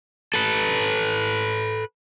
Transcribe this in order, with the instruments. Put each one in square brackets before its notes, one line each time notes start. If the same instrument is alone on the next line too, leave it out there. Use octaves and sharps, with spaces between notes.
[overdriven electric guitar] A4 B4